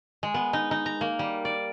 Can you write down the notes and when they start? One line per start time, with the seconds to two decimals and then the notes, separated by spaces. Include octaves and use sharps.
0.23 G#3
0.34 B3
0.53 D#4
0.71 D#4
0.86 A#5
1.01 A#3
1.19 G3
1.45 D5